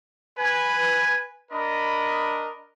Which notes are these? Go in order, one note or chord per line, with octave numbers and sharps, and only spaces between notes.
B4 G#5
D4 A#4 D#5 B5